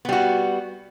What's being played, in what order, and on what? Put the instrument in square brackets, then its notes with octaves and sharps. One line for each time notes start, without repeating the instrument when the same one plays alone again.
[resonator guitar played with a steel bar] B3
G3
F#4